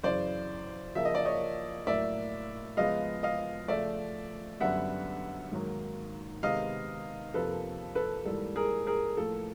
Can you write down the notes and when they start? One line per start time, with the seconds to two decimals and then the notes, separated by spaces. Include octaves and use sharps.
0.03 F#2 C#3 E3 C5 D5
0.95 C#3 F3 A#3 E5
1.05 D#5
1.15 D5
1.25 C#5 D#5
1.86 A2 F#3 A#3 D5 E5
2.77 C#3 F3 G#3 B3 D#5 F5
3.23 D#5 F5
3.68 C#3 F3 A3 D5 E5
4.60 F#2 D3 G3 B3 E5 F#5
5.52 G#2 D#3 F#3 A#3
6.43 C3 D#3 G#3 B3 D#5 F5
7.34 F2 C3 F3 A#3 A4 B4
7.95 A4 B4
8.25 G#2 E3 G3 A#3 A4
8.56 G#4 A#4
8.87 G#4 A#4
9.17 A2 F3 A#3 A4